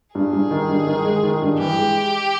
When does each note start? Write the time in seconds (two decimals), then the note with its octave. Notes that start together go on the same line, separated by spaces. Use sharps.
0.14 G2 G#4
0.33 G2
0.51 D#3
0.69 G2
0.87 D#3
1.05 G#3
1.23 D#3
1.42 G2
1.60 E3 G4
1.78 G#3